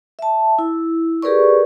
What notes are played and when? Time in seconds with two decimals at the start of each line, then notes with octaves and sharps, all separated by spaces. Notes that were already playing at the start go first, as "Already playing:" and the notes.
0.19 E5 A5
0.59 E4
1.22 G4 G#4 A#4 B4 D5 C#6